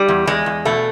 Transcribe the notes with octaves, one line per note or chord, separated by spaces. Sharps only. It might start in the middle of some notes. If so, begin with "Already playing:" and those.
Already playing: G3
E2
E2 G#3
E2
B2 A3